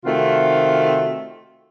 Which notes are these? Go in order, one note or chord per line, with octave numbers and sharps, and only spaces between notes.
C3 D#3 A3 C4 F4 F#4